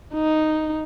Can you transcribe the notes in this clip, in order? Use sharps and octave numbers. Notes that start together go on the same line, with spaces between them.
D#4